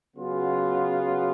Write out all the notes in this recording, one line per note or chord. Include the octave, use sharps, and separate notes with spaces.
C#3 F#3 B3 F4